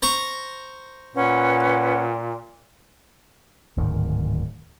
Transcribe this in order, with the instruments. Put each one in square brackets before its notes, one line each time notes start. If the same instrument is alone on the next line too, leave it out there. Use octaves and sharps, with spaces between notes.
[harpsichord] C5 A#5 C#6
[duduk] A#2 [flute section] C#4 B4 F#5
[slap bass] D1 G#2 D#3